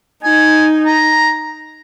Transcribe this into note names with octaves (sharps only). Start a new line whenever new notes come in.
D#4 G#5
A#5